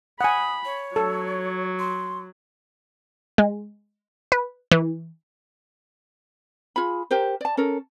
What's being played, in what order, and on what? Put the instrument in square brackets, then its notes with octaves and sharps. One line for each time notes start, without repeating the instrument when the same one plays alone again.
[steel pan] F#5 G#5 [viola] B5 [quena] D#6
[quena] C#5
[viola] F#3 [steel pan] A4
[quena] C6
[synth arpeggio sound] G#3
B4
E3
[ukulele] F4 G#4 B5
G4 A#4 C5
D5 A5
C#4 A4 A#4